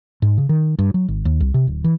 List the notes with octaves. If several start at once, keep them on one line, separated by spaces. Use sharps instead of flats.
G#2
C#3
D#3
G2
F#3
G#1
D#2
C2
C3
D1
E3